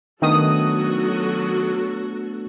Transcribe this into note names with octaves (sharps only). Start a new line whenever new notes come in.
D#3 F#3 A3 B3 D4 F#4 A4 D#6